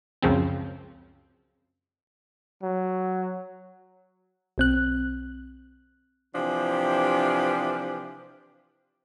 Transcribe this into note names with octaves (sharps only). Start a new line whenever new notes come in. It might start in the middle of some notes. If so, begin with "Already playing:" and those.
C#2 F#2 C#3 F3 C4
F#3
B1 C4 F#6
C3 E3 F3 D4 G4 G#5